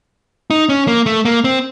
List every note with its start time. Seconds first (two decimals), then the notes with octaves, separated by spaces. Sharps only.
0.51 D#4
0.69 C#4
0.88 A#3
1.06 A3
1.25 A#3
1.44 C4